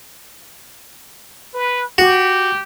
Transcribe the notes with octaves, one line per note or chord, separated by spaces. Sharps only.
B4
F#4 G4